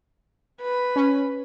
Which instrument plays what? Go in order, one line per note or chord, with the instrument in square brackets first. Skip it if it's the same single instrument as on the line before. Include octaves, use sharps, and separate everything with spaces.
[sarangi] B4
[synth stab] C#4